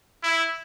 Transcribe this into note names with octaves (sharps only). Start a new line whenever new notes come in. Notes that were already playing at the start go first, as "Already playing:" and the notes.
E4